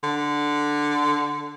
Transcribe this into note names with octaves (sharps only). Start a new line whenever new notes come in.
D3